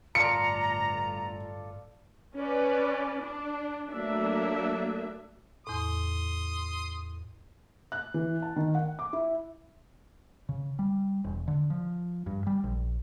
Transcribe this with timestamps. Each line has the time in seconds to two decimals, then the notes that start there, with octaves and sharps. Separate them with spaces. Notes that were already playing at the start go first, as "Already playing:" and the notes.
0.15 G1 A2 F4 A4 D5 A#5 C#7
2.36 C#4 B4 D5
3.22 D4
3.90 F#3 A3 A#3 D4 E5
5.67 E2 A2 C6 D#6
7.92 F#6
8.14 E3
8.42 A5
8.56 D#3
8.75 F#5
8.99 D6
9.13 E4
10.49 C#3
10.79 G3
11.24 E1
11.48 D3
11.70 F3
12.26 G2
12.47 G3
12.64 A#1